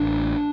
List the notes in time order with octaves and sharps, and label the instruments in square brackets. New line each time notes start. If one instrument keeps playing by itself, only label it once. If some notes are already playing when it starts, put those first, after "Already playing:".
Already playing: [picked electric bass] A1 D4